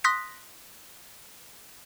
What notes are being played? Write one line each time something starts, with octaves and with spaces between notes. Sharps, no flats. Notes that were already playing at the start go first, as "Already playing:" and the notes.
C6 D#6 F#6 A#6 B6